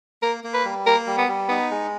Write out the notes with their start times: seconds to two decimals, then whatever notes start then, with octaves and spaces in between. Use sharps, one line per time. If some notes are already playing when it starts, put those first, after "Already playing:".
0.23 A#3 A#4
0.44 A#3
0.54 B4
0.65 G3
0.86 A#3 A#4
1.06 G3
1.18 B3
1.28 G3
1.49 B3 D#4
1.71 G#3